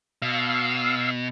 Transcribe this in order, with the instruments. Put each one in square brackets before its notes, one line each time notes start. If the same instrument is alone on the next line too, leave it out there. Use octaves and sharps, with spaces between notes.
[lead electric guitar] B2 [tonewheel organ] F5 E6